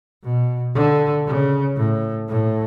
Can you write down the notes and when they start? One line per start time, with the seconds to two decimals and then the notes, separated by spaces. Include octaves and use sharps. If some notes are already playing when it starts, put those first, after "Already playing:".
0.24 B2
0.75 D3
1.26 C#3
1.77 A2
2.28 A2